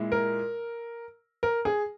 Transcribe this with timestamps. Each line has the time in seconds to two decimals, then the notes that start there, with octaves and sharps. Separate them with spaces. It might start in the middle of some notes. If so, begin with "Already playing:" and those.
Already playing: A#2 G#3 E4
0.12 A#4
1.43 A#4
1.65 G#4